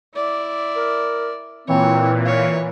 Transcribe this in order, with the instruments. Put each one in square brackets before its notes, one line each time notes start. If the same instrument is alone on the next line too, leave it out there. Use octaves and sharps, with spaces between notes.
[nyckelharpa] E4 D5
[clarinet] A#4
[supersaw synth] A#2 E3 [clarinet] C4 [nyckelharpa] C#5
[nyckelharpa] C#5 [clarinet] F5